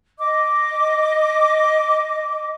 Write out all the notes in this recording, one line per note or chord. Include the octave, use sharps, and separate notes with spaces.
D#5 D6